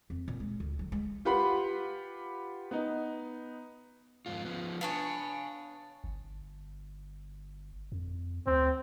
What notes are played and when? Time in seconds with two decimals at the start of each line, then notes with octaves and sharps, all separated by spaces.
0.10 F2
0.28 A#2
0.40 G#3
0.60 D2
0.79 F#3
0.92 G#3
1.25 F4 G4 B4 F#5 B5 C6
2.71 B3 D#4
4.26 F2 G#2 F4
4.45 F3 B3
4.81 B3 D4 C#5 F5 G#5
6.04 G1
7.92 F2
8.47 D2 C4